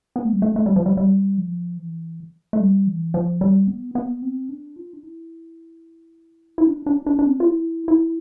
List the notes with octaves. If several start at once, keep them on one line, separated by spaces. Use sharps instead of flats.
B3
A3
G3
A3
A3
G3
F3
G3
G3
F3
E3
A3
G3
E3
F3
G3
B3
B3
C4
D4
F4
D4
E4
E4
D4
D4
D4
D4
C4
F4
E4
E4